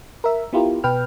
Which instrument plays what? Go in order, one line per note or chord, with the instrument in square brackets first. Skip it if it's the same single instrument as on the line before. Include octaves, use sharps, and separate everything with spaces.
[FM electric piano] A#4 E5
B3 E4 F4 G4 A#4
B2 B4 G5 F6